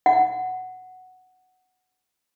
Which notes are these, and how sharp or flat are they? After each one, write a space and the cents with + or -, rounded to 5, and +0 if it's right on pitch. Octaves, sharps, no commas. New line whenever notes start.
F#5 +0